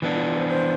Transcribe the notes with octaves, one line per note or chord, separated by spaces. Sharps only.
E3 B3 D4
F4
F4
C5
C5